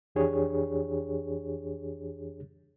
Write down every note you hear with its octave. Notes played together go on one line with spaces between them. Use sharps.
F2 E3 D4 G4 G#4 C#5